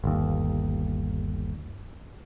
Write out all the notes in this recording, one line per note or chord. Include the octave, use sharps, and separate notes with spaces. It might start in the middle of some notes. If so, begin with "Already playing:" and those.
G1 D#2